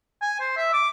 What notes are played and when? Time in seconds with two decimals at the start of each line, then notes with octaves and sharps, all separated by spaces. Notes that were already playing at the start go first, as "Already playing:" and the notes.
0.22 G#5
0.40 C5
0.57 E5
0.73 D6